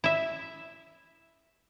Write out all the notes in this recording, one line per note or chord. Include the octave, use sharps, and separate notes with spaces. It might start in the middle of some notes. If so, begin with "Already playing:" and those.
E4 E5